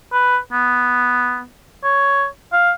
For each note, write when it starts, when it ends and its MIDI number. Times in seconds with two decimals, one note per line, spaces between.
0.12 0.37 71
0.52 1.43 59
1.84 2.25 73
2.52 2.71 77